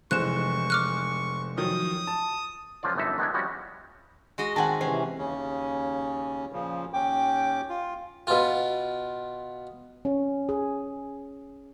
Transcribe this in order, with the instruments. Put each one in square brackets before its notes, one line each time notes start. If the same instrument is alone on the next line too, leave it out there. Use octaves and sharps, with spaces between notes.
[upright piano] F1 E3 G#3 [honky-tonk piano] C5 [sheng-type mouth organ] C#6 [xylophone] F#6 E7
[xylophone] D6 F6 F#6
[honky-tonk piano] D#3 F3 F#3 [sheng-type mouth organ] D#6
[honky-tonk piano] A5
[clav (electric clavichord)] C#2 F3 F#3 F4 D5
G1 F#2 E3 D#4 A4 E5
D#3 G#3 B3 D4 E4 G4
F3 G3 G#3 C#4 F#4
[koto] G#3 F#4 D#5
[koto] D#3 C4 [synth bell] F#5 G#5 A5
[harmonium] C3 E3 [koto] C#4 [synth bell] C5
[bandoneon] D#2 C#3 C#4
A#2 C#3 F3
[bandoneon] D#2 C#4 D6 [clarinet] G5
[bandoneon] F4
[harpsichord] B2 F4
[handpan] C#4
G#4